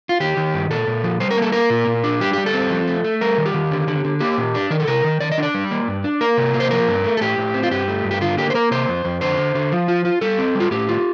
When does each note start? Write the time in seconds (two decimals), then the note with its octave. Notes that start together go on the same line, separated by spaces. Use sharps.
0.09 F4
0.20 D#3 G4
0.37 D#3
0.54 G2
0.70 A#2 A4
0.87 A#2
1.04 F3
1.20 G3 C5
1.31 A#4
1.37 A#3 A4
1.52 A#3 A#4
1.70 A#2
1.87 A#2
2.04 D4
2.20 G3 G4
2.33 G3 G4
2.46 A4
2.54 C4
2.70 F3
2.87 A3
3.04 A3
3.21 G3 A#4
3.38 D#3
3.46 G4
3.54 D#3
3.71 D3
3.88 D3
4.05 D3
4.20 A#3 G4
4.38 A#2
4.55 D4
4.70 D#3 A#4
4.80 A4
4.87 C3 A#4
5.04 D#3
5.20 D#3 D5
5.32 D#5
5.38 D4 D5
5.54 G3
5.71 A#3
5.88 G2
6.04 D4
6.21 A#3 A#4
6.37 C3
6.54 A#3
6.60 C5
6.71 F3 A#4
6.88 G2
7.04 A3
7.17 A4
7.21 A2 G4
7.38 A2
7.54 C4
7.63 F4
7.71 G2 G4
7.88 A3
8.04 G2
8.11 G4
8.21 D3 F4
8.37 A#3 G4
8.50 C5
8.55 A#3 A#4
8.71 C3 C5
8.88 F2
9.05 F2
9.21 D3 C5
9.37 D3
9.55 D3
9.72 F3
9.88 F4
10.05 F4
10.21 G3 A4
10.39 C4
10.55 G3 F4
10.71 A2 G4
10.89 F4